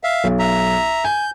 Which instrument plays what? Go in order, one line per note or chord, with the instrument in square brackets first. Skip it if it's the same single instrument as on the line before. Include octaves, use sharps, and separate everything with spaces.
[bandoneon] E5 F5
[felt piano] B1
[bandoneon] E5 A#5
[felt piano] G#5 [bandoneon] G6